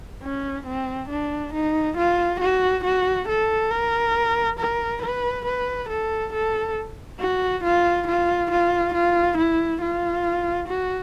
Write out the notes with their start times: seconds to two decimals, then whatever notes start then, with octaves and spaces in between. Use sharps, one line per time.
0.23 C#4
0.66 C4
1.09 D4
1.54 D#4
1.97 F4
2.41 F#4
2.84 F#4
3.28 A4
3.71 A#4
4.59 A#4
5.03 B4
5.46 B4
5.90 A4
6.33 A4
7.20 F#4
7.64 F4
8.08 F4
8.51 F4
8.94 F4
9.38 E4
9.82 F4
10.68 F#4